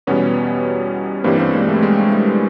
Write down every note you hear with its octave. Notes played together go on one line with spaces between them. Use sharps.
E2 B2 G3 B3 C#4
G2 E3 G3 A#3 C4
A#3 C4
G#3 A#3
A3
G#3
A3